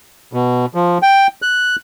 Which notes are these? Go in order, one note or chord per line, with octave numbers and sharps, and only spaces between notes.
B2
F3
G5
F#6